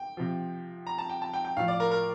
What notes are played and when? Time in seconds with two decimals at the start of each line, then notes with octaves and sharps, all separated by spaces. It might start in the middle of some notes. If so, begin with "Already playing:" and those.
Already playing: G5
0.17 C3 F3
0.87 A#5
0.98 A5
1.09 G5
1.22 A5
1.33 G5
1.45 G5
1.57 A2 F3 F5
1.68 D5
1.80 A#4
1.91 A#4